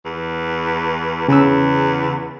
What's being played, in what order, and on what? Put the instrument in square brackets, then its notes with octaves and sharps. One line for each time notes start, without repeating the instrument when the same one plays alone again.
[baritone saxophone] E2
[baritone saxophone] E2 [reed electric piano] C#3 E6